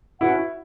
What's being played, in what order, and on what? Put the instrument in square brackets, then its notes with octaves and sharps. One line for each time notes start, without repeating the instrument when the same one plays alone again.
[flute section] C#4 F#4 B4 F#5 [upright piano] E4